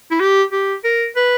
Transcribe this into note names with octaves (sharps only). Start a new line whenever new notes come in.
E4
G4
G4
A#4
B4